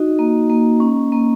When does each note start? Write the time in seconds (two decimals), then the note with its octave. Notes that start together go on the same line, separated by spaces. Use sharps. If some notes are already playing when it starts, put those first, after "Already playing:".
Already playing: D#4 F#4 D#5
0.19 A#3
0.49 A#3
0.80 C#4
1.12 A#3